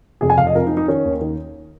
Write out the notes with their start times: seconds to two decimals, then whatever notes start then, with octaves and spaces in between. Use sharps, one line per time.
0.21 F1 G#4
0.30 G#5
0.38 F1 F5
0.47 D#5
0.55 F2 A#4
0.67 D#4
0.71 F2
0.77 D#4
0.88 D#3 C#4
1.05 D#2
1.21 D#3